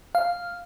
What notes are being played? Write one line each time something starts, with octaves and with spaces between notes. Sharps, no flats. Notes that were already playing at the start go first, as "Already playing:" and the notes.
F5